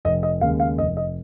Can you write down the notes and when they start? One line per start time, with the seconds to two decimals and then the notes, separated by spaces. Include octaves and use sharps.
0.05 F1 D#5
0.23 D#5
0.41 D#2 C#3 G#3 F5
0.60 F5
0.78 F1 D#5
0.97 D#5